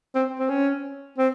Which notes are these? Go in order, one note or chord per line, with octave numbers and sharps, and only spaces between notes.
C4
C4
C#4
C4